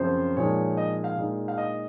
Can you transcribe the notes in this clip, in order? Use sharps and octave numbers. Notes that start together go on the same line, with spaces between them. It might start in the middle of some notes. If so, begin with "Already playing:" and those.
Already playing: F#2 C#3 F3 C4 C5
A#2 F3 G#3 D#4 C#5
D#5
F5
A#2 G#3 D#4
F5
D#5